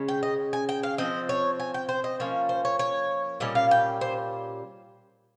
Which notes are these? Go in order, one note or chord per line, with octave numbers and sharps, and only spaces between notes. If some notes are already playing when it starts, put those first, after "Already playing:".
Already playing: C#3 G#3 C#4
G5
D#5
G#5
G5
F5
F3 C4 D#5
C#5
G#5
G5
C5
D#5
F3 A#3 C#4 C#5
C5
C#5
C#5
A#2 G3 C#4 D#5
F5
G5
C5